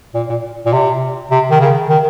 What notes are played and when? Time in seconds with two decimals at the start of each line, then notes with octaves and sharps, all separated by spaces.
0.14 A#2
0.30 A#2
0.66 A#2
0.73 C3
1.31 C3
1.51 D#3
1.60 C#3
1.89 D#3